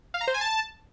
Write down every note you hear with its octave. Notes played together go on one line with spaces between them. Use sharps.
F5
A#5
C5
G#5
A5